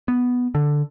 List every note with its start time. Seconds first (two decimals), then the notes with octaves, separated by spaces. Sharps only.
0.08 B3
0.55 D3